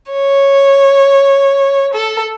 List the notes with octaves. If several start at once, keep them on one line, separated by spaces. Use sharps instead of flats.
C#5
A4